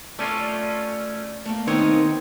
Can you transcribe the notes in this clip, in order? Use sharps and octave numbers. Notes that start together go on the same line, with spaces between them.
A3 C#4 F4 D5
A3 A#3
D#3 B3 C4 D#4 C#5